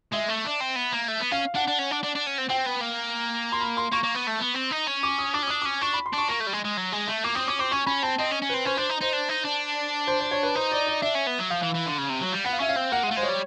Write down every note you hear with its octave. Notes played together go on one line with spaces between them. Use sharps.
G#3 E5
A3
D4
C4
B3
A#3
A3
B3
C#4 F5
D4 F#5
D4
C#4
D4
D4
D4
C#4
C4
C4 G5
B3
A#3
C6
B5
C6
A#3 C#6
A#3
B3
A3
B3
C4
D#4
C#4
D6
D#6
D4 D6
C#4
D4 D#6
C#4 D6
D4 C#6
B5
C6
D4 C#6
A#3 C#6
A3
G3
G#3
G#3
F#3
G#3
A3
A#3 D6
C4 D#6
C#4 D6
C4 D6
C#4 C#6
C#4 B5
C4 A5
C4 D#5
C#4
C#4
C4 B4
C#4 C5
D4 C5
D#4
D#4 C5
D4
D#4
D4
C5
C5
C#5
B4
D#4 C5
D5
D5
D4 E5
C#4
B3
F#3
F3 F5
E3
E3
D3
C#3
C3
F#3
G3
B3 F#5
F5
C#4 E5
F5
C4
A#3 F#5
G#3
A3 F5
G#3 C5
C#5
G3